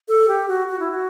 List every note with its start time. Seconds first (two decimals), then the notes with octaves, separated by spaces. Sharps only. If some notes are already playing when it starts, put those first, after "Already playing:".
0.08 A4
0.28 G4
0.48 F#4
0.68 F#4
0.79 E4
0.91 F#4